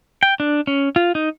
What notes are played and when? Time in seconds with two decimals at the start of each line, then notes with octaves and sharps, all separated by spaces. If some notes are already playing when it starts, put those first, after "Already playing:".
0.23 G5
0.40 D4
0.67 C#4
0.96 F4
1.15 D#4